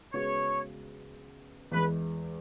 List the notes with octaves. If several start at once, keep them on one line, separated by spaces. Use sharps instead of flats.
C#3 G#3 B3 F#4 C#5
E2 E3 G#3 B4